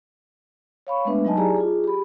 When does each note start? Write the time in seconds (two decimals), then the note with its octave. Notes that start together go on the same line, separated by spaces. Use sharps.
0.87 C#5 F5 B5 C#6
1.05 G#3 A3 B3 D4 B4 E5
1.25 F#3 D#4 D#5 G#5 A5
1.37 E4 G4 G#4 D5 G#5 A#5
1.57 F4 G#4
1.84 G4 B5